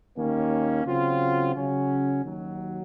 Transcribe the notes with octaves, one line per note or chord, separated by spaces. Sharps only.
D#2 D#3 A#3 C#4
C#3 F#3 C4 F4
C#3 F#3 C#4
D#2 D#3 F#3